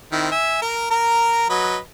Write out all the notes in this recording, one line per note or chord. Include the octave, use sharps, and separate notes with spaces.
D#3 C4 E4
E5 G#5
A#4 A#5
A#4 A#5
F#3 B4 D#5